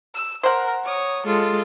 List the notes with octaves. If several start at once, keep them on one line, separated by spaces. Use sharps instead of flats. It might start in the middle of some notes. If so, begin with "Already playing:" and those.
E6
A#4 C5 F#5
C#5 D#6
G#3 F4 A4